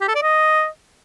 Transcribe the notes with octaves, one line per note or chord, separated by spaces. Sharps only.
G4
A4
D5
D#5